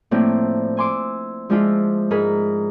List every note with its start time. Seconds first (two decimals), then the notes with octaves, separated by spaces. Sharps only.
0.11 A2 F3 A#3 C4 D4 E4
0.77 G#5 C6 D6 E6
1.49 F3 G#3 D4 E4 F4
2.11 G#2 G#4 A#4 B5